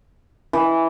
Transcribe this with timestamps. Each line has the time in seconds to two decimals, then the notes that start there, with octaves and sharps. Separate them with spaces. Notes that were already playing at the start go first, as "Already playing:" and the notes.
0.53 E3